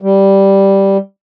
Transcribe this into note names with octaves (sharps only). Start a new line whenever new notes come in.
G3